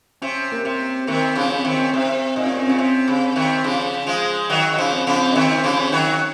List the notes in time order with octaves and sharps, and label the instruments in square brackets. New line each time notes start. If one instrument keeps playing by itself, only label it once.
[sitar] C3 [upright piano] C#4
[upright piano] A#3
[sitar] C3 [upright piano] C4
[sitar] C3 D#3 [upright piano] A#3
[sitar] C#3 F3
[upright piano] C#4
C4
[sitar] C3 D#3
[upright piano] C#4
[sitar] C3 [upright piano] C4
[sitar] A#2 [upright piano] D#4
[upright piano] C#4
C4
[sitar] C#3 [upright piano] C#4
[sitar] C3
C#3
C3 D#3
C#3 F3
F3 G#3
[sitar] D#3 F#3 [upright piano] D#4
[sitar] F#3 [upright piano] D#4
[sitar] C#3 F3
[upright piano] C4
[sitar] C#3 F3
[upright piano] C4
D#4
[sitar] C3 D#3 [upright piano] C#4
[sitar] C#3 F3
[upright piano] C#4
[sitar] D#3 F#3